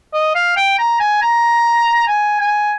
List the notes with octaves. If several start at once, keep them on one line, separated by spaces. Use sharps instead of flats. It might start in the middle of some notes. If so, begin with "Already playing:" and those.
D#5
F5
G5
A#5
G#5
A#5
G#5
G#5